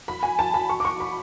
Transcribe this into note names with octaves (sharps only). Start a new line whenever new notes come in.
B5
G#5
A5
B5
C#6
D6
C#6
B5